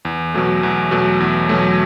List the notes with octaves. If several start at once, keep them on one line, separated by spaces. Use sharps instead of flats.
E2
B2 F#3 A3
E2
B2 F#3 A3
E2
B2 F#3 A3